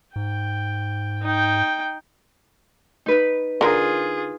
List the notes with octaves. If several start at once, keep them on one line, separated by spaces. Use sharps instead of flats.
G#2 G5
D#4 G5
D#4 B4
D3 F4 G#4 A#4